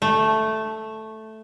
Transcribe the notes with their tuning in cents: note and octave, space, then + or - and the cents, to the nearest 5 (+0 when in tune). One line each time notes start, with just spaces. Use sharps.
A3 -5